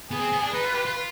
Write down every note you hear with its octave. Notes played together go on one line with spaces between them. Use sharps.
B3 G#4
C4
B3
D4
D#4 B4
F4
G4
F4